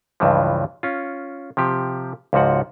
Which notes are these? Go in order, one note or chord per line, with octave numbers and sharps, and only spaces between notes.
C#2 G2 E3 F3
C#4 F4
C3 F3 G4
C#2 G#2 F3 F#4 F#5